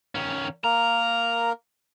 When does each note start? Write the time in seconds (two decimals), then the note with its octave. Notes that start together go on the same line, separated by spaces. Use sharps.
0.15 D#3 C#4
0.64 A#3 A#4 A#5